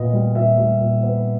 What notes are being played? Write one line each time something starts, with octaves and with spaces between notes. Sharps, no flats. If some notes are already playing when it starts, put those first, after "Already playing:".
Already playing: A#2 B3 D#5
G3
A#2 E5
G3
A#2
B3